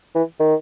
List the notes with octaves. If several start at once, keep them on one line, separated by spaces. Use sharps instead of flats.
E3
D#3